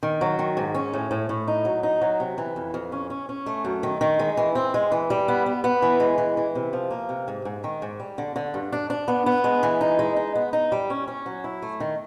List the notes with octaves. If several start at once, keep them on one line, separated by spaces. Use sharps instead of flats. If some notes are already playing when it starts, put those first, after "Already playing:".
D#3
F#3
D#3
G#2
C#4
A2
A2
A2
D#4
F#3
D#4
F#3
C3
E3
F2
F2
C#4
C#4
C#4
A3
F#2
D#3
D#3
G#3
E3
C4
G#3
E3
G3
B3
B3
B3
E3
G#3
E3
E3
C3
F3
A#3
C3
G#2
G#2
D#3
G#2
G3
D3
D3
G2
D4
D4
B3
B3
G#3
E3
D#4
G#3
D#4
B3
D#4
G3
C#4
C#4
F#3
E4
A3
D#3